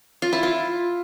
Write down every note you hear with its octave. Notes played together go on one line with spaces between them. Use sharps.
F4
E4
F4